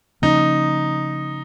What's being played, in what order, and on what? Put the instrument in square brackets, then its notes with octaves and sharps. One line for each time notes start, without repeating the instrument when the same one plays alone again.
[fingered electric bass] C#3 F3 A#3 C#4 [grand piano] D#4